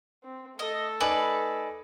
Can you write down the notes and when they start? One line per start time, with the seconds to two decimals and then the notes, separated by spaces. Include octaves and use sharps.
0.23 C4
0.59 A3 A4 D#5
1.00 D#4 B4 D5 G#5